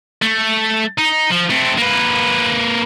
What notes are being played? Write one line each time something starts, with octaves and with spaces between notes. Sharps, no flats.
A3
D#4
F3
A3 C4
A#3 B4